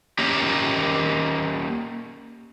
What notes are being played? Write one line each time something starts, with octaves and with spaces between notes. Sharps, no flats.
A#3 C#4 G4 A#4